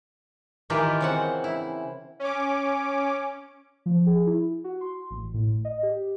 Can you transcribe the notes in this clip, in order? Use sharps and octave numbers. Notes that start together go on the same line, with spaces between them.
D#3 E3 F4 G4 A#4 B4
C#3 C4 F#5
E4
C#4 D6
F3
G#4
E4
F#4
C6
A1
A2
D#5
G4